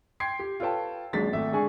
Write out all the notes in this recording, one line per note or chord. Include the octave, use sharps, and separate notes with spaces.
G5 C6 G#6 C7
G4
F4 A4 B4 C#5 G5 A5
D#1 A#1 F#3 G#3 A6 B6
G#1 A3 E5
D3 G#3 G#4 G#5 C#6